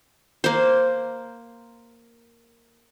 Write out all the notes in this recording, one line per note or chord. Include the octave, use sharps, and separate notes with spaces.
A#3 C5